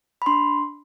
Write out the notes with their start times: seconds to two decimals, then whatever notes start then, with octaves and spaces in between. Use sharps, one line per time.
0.22 B5
0.26 D4 C6